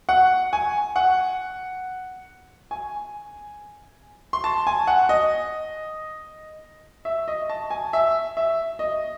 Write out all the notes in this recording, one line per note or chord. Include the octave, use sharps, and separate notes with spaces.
F#5
G#5
F#5
G#5
C6
A5
G#5
F#5
D#5
E5
D#5
A5
G#5
E5
E5
D#5